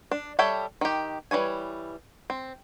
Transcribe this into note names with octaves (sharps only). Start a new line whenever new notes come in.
D4
G3 A4 C#5 E5 G5
D#3 G4
E3 G3 C#5 G#5
C4